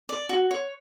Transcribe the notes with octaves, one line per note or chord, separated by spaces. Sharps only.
D5
F#4
C#5